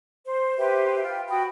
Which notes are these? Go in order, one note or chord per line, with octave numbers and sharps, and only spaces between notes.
C5
G4 B4 C5 E5
F4 G5
F#4 G5 B5 D#6